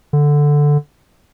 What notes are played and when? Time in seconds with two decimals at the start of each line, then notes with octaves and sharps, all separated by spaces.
0.13 D3